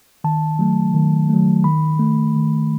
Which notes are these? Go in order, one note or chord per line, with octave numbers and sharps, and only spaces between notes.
D#3 A5
F#3 A3
D#3
F#3 A3
D#3 B5
A3
D#3